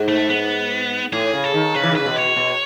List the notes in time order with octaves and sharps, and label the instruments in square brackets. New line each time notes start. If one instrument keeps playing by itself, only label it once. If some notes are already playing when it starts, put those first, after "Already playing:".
Already playing: [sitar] G#2
[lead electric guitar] A3
B3
[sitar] A2 [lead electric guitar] G#4
[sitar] C#3
[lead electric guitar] A4
[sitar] D#3
[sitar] C#3 [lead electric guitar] B4
[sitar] E3
D#3
[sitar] C#3 [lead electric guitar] B4
[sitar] B2
[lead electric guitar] C#5
[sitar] B2